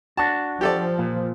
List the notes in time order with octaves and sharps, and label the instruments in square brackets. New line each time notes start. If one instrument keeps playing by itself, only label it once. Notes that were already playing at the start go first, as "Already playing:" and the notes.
[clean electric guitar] D4 F#4 [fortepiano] A5
[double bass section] F3 [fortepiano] G4 A4 D5
[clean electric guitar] A#2